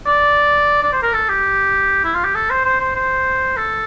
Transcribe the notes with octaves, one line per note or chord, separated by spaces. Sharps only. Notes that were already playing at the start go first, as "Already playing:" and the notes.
D5
D5
C5
A#4
A4
G4
E4
F4
G4
A4
C5
C5
C5
C5
A4